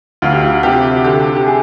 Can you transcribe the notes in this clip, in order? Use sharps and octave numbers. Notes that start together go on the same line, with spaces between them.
D2 F4
G4
F4
C3 G4
D3 G4
G4
G#4